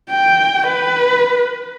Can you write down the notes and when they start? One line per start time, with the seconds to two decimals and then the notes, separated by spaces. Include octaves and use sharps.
0.10 G5
0.67 B4